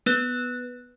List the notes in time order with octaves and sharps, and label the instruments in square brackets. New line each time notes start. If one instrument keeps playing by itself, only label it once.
[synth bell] B3 B4 F#6